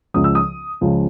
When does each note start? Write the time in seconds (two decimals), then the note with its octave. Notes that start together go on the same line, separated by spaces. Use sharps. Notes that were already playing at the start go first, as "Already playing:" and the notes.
0.14 C#2 C#3 F3 D#6
0.24 E6
0.35 D#6
0.81 C#2 C#3 F3